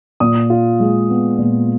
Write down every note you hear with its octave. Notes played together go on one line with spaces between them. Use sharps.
A#2 D#6
F4
G#3
B3
A#2